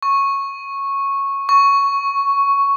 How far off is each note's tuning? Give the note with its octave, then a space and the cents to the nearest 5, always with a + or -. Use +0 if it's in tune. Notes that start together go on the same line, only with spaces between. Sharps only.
C#6 -10
C#6 +5